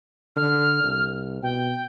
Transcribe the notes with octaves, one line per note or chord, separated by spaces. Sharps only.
D3 F6
C2
B2 G5